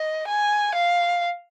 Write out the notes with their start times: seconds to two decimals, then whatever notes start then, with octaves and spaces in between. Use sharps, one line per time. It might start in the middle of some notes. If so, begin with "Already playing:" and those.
Already playing: D#5
0.27 G#5
0.75 F5